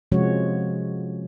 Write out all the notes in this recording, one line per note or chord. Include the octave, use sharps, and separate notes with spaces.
C3 F3 G#3 C#4 F#4 C#5